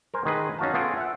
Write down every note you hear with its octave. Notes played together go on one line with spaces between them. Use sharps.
A#4 C5 G#5
D#3 G#3 G#4 B4 D#5
C#4 D#4 F#4 F5 A5
B3 F4 G#4 A4 G5
E5 F#5